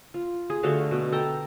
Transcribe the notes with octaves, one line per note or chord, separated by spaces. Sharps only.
F4
G#4
D3 A3 F#4 F5
B2
A4 G5 A5 A#5